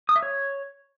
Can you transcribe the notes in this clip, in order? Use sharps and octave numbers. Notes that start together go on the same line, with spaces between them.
D#6
E5
C#5